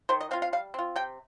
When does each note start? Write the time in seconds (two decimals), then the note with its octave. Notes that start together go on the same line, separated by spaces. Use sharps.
0.09 D#3 C5
0.21 D#5
0.31 C4 F4 F5
0.42 F5
0.53 G3 F5
0.74 C4 F4
0.96 C3 G5